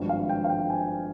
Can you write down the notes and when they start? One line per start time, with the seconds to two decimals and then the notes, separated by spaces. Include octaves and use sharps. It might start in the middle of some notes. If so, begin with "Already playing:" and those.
Already playing: G#1 G2 F3
0.09 F5
0.29 G5
0.44 F5
0.50 G5
0.70 G#5